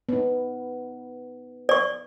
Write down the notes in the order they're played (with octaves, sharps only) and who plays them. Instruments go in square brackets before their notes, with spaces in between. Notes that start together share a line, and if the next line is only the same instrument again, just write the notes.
[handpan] B3 D#4
[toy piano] D5 C#6